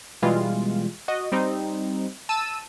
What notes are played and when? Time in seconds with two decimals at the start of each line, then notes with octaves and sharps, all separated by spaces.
0.22 B2 E3 G3 G#3 F4
1.08 F#4 D#5
1.32 G3 C4 D#4
2.29 A5 E6 D#7